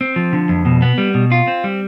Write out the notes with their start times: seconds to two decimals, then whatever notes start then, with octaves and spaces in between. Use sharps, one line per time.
0.01 C4
0.16 F3
0.33 D3
0.49 F2
0.65 B2
0.82 B3
0.98 G3
1.14 B2
1.32 F4
1.47 C4
1.64 G3